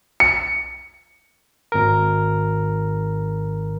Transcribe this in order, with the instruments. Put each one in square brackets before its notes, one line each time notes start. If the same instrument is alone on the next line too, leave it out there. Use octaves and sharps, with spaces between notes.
[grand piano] C#7
[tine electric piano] G#1 A#4